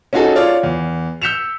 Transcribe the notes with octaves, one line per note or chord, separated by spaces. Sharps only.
C#4 D#4 F#4 G#4 A4 A5
F4 C#5 D5 F5
E2
E6 G6 B6 C#7 E7 F7